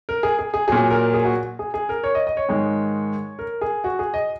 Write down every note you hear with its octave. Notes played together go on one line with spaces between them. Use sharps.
A#4
G#4
G#4
G#4
A#2 F#3 G#4
A#4
G#4
F#4
G#4
G#4
A#4
C#5
D#5
D#5
C#5
G#2 D#3 G#3
A#4
G#4
F#4
G#4
D#5